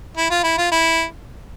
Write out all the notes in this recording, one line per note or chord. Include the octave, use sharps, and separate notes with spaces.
E4
F4
E4
F4
E4